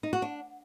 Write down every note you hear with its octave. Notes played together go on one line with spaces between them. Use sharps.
D#4
F#4
D4